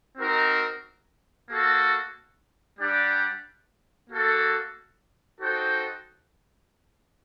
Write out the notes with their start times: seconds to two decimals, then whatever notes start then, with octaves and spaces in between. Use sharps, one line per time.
0.18 C4 D#4 F#4 A#4
1.49 A#3 F#4 A4
2.79 G3 D4 G4 D5 F#5
4.09 A#3 F#4 A4
5.40 D#4 F#4 A4 C5 G5